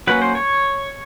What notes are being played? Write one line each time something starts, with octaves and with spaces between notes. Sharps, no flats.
F#3 A#3 C#4 B4
C5
C#5